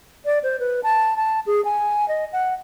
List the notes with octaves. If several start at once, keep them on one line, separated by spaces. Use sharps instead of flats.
D5
C5
B4
A5
A5
G#4
G#5
D#5
F#5